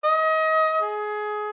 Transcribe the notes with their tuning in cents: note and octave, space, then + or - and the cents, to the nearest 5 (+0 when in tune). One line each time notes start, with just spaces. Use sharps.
D#5 +30
G#4 +20